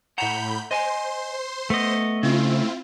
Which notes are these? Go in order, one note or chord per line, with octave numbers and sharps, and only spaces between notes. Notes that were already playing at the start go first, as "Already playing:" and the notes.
A2 F#5 A#5 B5 G6
C5 D#5 G#5 C6
A3 B3 D#5
C#3 C4 E4 F4